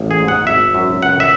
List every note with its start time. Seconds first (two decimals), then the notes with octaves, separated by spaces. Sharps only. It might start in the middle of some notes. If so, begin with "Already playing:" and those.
Already playing: A1
0.11 G#4
0.19 G#2
0.28 F#5
0.47 G#1 E5
0.75 F#2
1.02 C#2 F#5
1.20 E5